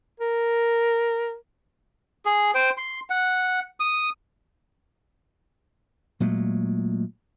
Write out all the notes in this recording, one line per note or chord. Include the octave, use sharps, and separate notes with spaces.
A#4
G#4
C5 G5
C6
F#5
D#6
A#2 F#3 G#3 A3